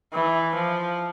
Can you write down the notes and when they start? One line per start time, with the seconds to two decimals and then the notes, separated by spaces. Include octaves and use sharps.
0.13 E3
0.55 F3